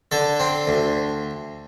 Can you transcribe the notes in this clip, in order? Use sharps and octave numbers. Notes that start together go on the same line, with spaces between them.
D3 A4
C4
D2